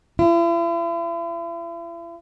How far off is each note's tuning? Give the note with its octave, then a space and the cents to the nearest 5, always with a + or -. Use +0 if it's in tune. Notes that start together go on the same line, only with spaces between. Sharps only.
E4 +45